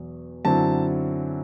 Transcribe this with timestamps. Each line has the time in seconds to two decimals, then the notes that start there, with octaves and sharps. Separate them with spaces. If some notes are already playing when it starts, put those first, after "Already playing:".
Already playing: E2 B2 F#3
0.45 F#2 D3 F#3 C4 E4 A5